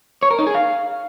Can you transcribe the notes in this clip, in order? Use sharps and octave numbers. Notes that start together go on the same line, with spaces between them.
C#5
A#4
D#4
G#4
F5